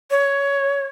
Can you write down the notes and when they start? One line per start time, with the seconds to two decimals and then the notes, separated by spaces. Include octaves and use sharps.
0.11 C#5